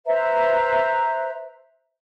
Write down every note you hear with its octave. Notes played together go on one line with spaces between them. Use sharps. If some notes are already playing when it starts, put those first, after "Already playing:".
B4 C5 E5 A#5